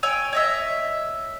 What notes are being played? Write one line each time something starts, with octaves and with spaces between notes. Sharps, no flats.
C#5 G5 G#5 E6
C#5 D#5 E5